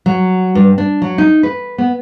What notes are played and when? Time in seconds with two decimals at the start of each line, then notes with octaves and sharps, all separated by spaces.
0.06 F#3
0.55 G2
0.78 D4
1.02 F#3
1.18 D#4
1.43 B4
1.78 B3